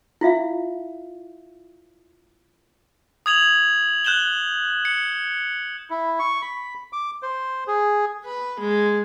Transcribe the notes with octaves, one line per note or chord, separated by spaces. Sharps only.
E4 F4 E5 F5
D#6 G#6 F7 F#7
F#6 G6 E7 F#7 G7
C#7
E4
C#6
B5
D6
C5
G#4
B4
G#3